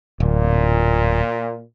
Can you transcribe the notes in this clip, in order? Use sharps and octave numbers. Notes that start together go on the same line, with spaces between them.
D1 A#2